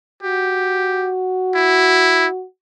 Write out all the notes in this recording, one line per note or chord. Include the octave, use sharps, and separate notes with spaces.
F#4 G4
E4